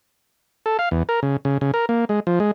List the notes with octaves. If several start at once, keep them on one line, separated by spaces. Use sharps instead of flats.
A4
F5
E2
A#4
C#3
C#3
C#3
A#4
A#3
G#3
F3
G#3